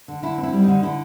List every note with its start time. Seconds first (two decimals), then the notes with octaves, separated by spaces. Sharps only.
0.08 D3
0.23 D3 E4
0.38 C4
0.43 E4
0.53 G3
0.62 D#4
0.68 D3
0.83 D3 E4